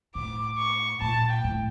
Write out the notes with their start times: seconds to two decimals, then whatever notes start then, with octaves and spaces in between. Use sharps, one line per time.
0.15 A2 D6
0.58 C#6
1.01 A#2 A5
1.29 G5
1.44 A2